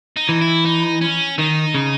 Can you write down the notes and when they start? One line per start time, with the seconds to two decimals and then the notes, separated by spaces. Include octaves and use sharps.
0.16 D#4
0.29 E3
0.41 E4
0.65 D#4
1.01 C#4
1.38 D#3 D#4
1.74 C#3